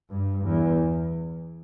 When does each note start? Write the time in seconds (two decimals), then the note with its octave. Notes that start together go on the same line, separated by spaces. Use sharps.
0.10 G2
0.45 E2